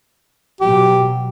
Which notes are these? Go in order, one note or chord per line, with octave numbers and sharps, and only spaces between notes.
B2 F#3 G4